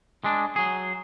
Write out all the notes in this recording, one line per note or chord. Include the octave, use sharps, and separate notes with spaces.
G#3 D4
F#3 G#4